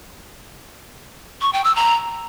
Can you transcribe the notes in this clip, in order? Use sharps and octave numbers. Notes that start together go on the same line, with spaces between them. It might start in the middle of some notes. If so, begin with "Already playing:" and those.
C#6
G5
E6
A#5